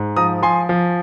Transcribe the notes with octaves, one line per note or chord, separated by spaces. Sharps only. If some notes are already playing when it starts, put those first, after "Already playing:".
Already playing: G#2
F3 A#5 D#6
F3 G#5 C6
F3